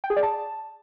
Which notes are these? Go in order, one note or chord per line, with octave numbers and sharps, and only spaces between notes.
G5
G#4
D5
A5